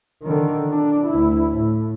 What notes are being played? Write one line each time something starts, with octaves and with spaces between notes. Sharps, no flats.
D3 D#3
D4
D2 E4
A2